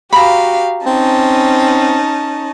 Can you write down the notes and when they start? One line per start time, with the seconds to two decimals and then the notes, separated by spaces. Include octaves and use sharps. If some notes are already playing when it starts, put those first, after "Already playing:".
0.13 F#4 G4 F5 A#5 B5
0.86 C4 C#4 D#4 A5